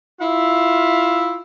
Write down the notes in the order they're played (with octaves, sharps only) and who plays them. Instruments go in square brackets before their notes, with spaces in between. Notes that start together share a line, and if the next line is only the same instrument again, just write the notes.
[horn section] E4 F4 E5 F5